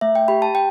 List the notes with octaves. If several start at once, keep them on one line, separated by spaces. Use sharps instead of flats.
A3 E5
G5
G4 B5
A5
G5